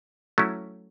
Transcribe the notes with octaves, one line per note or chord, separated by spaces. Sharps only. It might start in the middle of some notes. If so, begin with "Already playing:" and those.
F#3 A3 C#4 E4